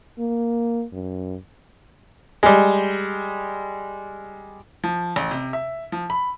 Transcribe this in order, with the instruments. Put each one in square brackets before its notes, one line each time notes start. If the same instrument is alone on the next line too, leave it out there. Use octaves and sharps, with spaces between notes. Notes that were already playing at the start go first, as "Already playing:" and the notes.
[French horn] A#3
F#2
[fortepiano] G3 G#3
[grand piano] F3
A1
C3
E5
F3
B5